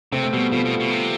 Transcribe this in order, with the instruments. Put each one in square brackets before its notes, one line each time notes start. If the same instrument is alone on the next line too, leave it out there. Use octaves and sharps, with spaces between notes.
[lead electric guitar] C3 [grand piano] A3 C4
[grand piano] A3
[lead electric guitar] B2 [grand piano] G3 B3
[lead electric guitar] B2 [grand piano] F3 A3
[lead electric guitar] B2
B2
C3